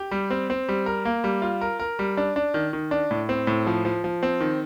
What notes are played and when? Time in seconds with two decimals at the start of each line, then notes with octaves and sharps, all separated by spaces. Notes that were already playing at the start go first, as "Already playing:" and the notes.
Already playing: G4
0.11 G3
0.30 C4
0.50 C4
0.69 G3
0.86 A#4
1.05 A#3
1.24 G3
1.42 F4
1.61 A#4
1.80 A#4
1.99 G3
2.17 D4
2.36 D4
2.54 D#3
2.73 D#3
2.91 D4
3.11 A2
3.29 C4
3.47 A2
3.67 F3
3.85 F3
4.04 F3
4.23 C4
4.40 D#3